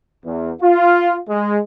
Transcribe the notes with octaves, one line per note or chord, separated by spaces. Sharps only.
E2
F4
G#3